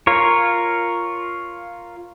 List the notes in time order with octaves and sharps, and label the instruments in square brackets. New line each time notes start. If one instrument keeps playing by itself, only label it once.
[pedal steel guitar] F4 A#4 C#5